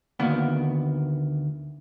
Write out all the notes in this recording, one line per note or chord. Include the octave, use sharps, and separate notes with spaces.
D2 D#3 A#3 B3